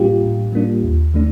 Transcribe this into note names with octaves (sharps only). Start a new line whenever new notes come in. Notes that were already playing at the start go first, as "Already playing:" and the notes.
Already playing: A2 G3 A#3 D4 F4 G4
A2
G3 A#3 D4
D#2
D#3 A3 D4